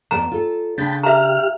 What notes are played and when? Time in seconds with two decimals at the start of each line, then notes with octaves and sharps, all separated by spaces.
0.11 F2 B3 D5 A#5
0.32 F4 A4
0.78 C#3 D4 G5 A5 B5
1.03 G4 E5 F5 A#5 F6